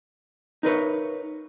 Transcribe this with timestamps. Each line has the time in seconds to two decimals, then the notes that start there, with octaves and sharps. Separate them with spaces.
0.63 D#4 A#4 B4 C#5